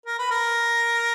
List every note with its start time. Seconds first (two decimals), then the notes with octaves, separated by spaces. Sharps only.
0.06 A#4
0.19 B4
0.31 A#4